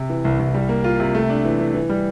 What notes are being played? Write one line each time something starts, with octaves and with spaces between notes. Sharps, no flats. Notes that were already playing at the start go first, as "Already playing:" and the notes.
Already playing: C3
E3
C2
C2
G3
A#3
F4
C3
A3
D4
E3
E3
E3
G3